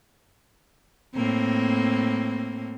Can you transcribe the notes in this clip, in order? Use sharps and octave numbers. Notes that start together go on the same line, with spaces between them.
A2 A#3 C4